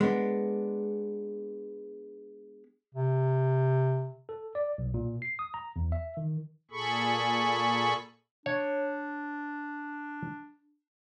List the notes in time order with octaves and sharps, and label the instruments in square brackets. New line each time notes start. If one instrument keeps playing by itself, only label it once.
[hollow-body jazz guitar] G#3 B3 D4
[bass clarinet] C3
[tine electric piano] A4
D5
B1
A#2
C7
D#6
A#5
E2
E5
D#3
[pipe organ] A#2 G#4 A4 B5 C#6
[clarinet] D4 [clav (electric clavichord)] C#5